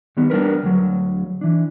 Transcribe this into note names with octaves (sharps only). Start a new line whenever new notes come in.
D#3 G3 B3
G3 D4 A#4 B4
D2 F#3
E3 D4